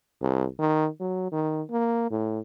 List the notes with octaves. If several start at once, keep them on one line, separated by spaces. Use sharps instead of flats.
C2
D#3
F#3
D#3
A#3
A2